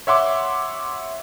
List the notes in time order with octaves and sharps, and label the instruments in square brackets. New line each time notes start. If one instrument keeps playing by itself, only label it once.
[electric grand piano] C#5 E5 F#5 C6 D6